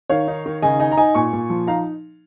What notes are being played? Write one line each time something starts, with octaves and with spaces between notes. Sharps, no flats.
D#3 C#5 F5
D#4
D#3
C#3 D#5 G#5
D#4 D#5 G#5
A#5
D#4 D#5 G#5
A#2 G#5 C#6
A#2
F3
D#4 F5 A#5